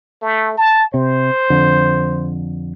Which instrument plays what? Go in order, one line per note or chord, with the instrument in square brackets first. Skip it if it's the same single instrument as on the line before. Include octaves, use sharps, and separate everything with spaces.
[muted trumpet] A3
A5
[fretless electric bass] C3 [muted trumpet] C5
[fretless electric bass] F2 D3